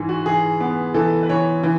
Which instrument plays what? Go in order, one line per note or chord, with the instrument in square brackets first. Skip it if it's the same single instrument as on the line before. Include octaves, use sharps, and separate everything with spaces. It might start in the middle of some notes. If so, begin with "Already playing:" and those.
Already playing: [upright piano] G#2 E3
[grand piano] F#4
[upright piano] E3 [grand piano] G#4
[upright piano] B3
[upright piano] E3 [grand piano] A4
[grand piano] B4
[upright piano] E3 [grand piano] C#5
[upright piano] E3